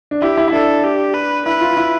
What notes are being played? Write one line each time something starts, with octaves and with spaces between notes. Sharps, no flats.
D4
E4 G4
E4
E4
D4 A4
G4
B4
E4 B4
F4
E4